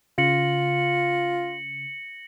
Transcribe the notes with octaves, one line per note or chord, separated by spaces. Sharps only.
C#3 F4 A#6 C#7 F#7